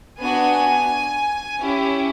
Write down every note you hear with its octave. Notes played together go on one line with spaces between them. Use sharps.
B3 D4 F#4 G#5
C#4 E4 G4